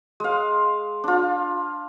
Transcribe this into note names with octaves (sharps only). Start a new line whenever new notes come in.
G#3 F5
D4 F4